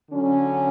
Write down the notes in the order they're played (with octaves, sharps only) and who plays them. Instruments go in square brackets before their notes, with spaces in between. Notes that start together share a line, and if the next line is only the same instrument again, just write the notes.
[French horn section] D3 F#3 C#4